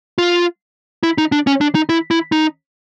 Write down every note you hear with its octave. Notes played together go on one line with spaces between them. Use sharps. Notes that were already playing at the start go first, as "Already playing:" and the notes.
F4
E4
D#4
D4
C#4
D4
D#4
E4
E4
D#4